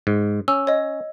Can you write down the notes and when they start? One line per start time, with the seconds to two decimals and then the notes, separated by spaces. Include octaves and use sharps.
0.07 G#2
0.48 C#4 E6
0.67 C#5 D#5